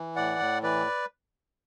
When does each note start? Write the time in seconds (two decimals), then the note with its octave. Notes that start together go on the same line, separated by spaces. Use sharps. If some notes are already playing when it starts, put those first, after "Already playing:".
Already playing: E3
0.16 A2 D5 F#5
0.40 A2
0.63 E3 B4 D5